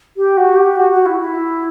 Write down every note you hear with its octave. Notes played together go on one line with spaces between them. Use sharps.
G4
F#4
G4
F#4
F#4
E4
E4